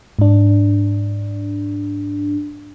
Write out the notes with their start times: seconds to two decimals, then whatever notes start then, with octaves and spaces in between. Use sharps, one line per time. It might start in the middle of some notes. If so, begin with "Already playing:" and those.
0.19 G#2 D4